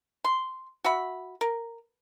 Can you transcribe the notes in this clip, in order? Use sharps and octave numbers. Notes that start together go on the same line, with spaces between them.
C6
F#4 E5 B5
A#4